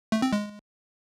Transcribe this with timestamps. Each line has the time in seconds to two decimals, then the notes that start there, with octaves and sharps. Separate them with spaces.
0.12 A3
0.22 C4
0.33 G#3